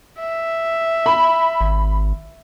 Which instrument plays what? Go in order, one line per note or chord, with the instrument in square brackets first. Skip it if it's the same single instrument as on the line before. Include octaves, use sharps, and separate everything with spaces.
[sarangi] E5
[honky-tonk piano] B5
[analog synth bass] G#1